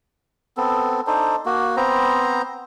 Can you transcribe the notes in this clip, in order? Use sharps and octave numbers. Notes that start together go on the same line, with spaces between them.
B3 C4 A4
D4 D#4 A4 C5
A#3 F#4
B3 C4 C5 A#5